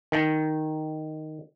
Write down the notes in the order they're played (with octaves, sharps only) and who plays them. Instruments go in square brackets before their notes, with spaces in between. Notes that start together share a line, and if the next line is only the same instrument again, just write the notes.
[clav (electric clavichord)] D#3